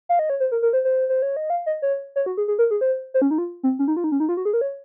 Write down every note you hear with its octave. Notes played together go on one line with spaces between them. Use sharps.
F5
D#5
C#5
C5
A#4
A#4
C5
C5
C5
C#5
D#5
F5
D#5
C#5
C#5
F#4
G#4
G#4
A#4
G#4
C5
C5
C#4
D#4
F4
C4
C#4
D#4
F4
D#4
C#4
D#4
F4
F#4
G#4
A#4
C#5